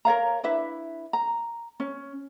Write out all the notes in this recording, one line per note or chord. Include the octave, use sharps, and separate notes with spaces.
A#4 C#5 F5 A#5
D4 E4 B4 E5
A#5
C#4